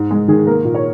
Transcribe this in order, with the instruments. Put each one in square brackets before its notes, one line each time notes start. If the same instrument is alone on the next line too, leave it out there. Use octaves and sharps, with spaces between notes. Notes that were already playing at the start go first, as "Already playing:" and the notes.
Already playing: [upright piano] G#2
G#3
D#3 G#4
A#3 A#4
A#2
C#5